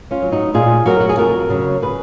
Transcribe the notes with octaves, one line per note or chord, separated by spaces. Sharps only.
C#4 F4
F#3
D#4 F#4
A#2 F4 G#4
F#3 F#4 A#4
F#4
G#4
F2 F#4 A#4
C#3 F#3
G#4 B4